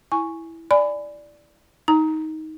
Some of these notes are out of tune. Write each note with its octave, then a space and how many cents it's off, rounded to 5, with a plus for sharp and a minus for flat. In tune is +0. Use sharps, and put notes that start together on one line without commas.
E4 +0 G#5 +0 C#6 +0
D5 +0 G#5 +0 B5 +25
D#4 +15 A#5 +0